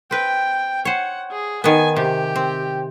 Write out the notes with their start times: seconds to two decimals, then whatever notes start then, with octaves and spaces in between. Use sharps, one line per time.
0.11 C4 B4 G5
0.85 C5 C#5 F#5
1.31 G#4
1.64 D#3 B3 G#5
1.96 C3 G4
2.36 C4